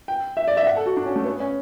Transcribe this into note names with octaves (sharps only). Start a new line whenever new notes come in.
G5
E5
D5
E5
F#5
A4
F#4
D4
C#4
A3
B3
C#4